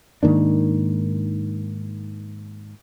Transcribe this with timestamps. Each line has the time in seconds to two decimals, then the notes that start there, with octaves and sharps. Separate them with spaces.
0.23 G#2 D#3 A#3 D4